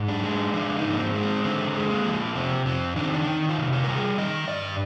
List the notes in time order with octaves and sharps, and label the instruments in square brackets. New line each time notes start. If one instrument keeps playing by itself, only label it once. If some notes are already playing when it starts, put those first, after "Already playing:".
Already playing: [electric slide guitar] G#2
D4
G#3
F3 D4
D#4
G#2
A#3
C4
G#3
C4
D3 C4
G#3
A#3
F3
C3 C4
F2 C4
D#3 D4
C4
D4
D#3 D#4
F4
C3
F4
G3 A#4
G#4
D#3 D#5
G2 D5